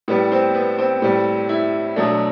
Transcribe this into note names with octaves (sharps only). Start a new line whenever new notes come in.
A2 G3 B3
C4
B3
C4
A2 G3
E4
B2 F#3 A3 D4